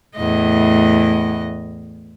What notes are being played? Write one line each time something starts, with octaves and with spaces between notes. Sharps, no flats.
E2 A2 D#5